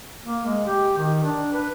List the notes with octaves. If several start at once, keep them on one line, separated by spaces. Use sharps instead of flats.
A#3
G#3
G4
D#3
D4
B4